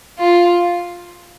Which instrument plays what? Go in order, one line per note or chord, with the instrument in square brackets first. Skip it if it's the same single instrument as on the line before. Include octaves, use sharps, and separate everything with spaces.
[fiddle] F4